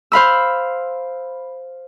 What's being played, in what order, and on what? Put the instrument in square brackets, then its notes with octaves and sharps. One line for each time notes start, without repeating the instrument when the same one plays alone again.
[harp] C5 F5 B5 E6